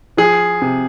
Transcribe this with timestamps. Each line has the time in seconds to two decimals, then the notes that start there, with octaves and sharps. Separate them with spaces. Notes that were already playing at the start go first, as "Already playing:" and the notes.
0.17 F3 G#4
0.62 C3